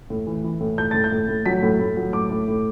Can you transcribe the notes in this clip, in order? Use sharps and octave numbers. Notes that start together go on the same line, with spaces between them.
A2
E3
E3
A2
A2 G6
A2 A6
G6
A2
A2
F#3 B6
A2
A2
F#3
A2 D6
A2
A2